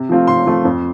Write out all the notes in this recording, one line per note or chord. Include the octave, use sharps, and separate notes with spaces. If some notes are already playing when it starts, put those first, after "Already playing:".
Already playing: C3
F3 A3 C4 F4
C3 C6
F3 A3 C4 F4
F2